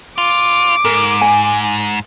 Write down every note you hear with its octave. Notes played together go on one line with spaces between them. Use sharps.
F4 D6
G#2 A#4
G#5